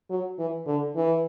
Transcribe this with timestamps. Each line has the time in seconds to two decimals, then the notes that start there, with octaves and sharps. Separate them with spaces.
0.10 F#3
0.39 E3
0.67 D3
0.96 E3